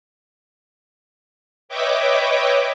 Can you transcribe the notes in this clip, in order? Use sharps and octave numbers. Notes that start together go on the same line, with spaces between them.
B4 C#5 D#5 E5 G5 D6